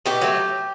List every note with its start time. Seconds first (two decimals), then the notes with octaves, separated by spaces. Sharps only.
0.06 B2 G4
0.21 F#3 A3